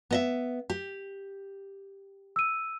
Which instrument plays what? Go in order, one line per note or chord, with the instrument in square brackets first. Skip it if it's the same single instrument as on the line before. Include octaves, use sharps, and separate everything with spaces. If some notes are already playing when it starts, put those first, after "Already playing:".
[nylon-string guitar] B3 D#5 E5
G4
[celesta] E6 D#7